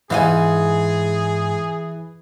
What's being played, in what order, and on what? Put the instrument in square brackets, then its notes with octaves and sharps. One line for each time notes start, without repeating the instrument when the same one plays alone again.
[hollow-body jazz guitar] G#2 F5 G#5 [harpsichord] E3 [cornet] G#4